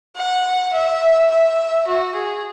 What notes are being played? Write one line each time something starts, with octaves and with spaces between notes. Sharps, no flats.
F#5
E5
E5
F#4
G#4